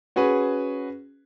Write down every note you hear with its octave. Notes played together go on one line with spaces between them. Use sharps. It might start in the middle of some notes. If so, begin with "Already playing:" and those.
C#4 F#4 G#4 B4